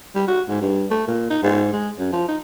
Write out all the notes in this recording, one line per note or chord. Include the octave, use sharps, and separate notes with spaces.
G3
F#4
G#2
G2
A3
A#2
D#4
G#2
G#3
F#2
F3
D#4